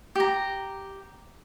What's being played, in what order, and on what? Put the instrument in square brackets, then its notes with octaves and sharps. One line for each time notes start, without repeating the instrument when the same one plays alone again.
[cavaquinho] G4 A#5